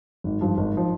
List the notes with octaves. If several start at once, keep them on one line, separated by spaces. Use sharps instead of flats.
G#1
G2 F3
G#1
F3